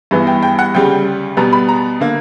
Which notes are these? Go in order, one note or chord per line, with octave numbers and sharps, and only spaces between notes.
G2 E3 B3
G5
G5
F#5
D2 C#3 G3 G5
B2 G3 B3 A#5
B5
A#5
D3 A#3